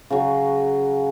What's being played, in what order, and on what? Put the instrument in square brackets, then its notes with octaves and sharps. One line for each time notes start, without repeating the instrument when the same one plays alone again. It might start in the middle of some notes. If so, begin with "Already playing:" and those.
[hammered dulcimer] C#3 F#3